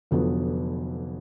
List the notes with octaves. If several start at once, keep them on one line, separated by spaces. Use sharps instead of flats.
F1 F2 D3 F#3 B3